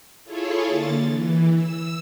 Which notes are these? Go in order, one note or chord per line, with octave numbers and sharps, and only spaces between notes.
E4 F4 G#4 A4 C#5
D3 A#3 A6
E3
E6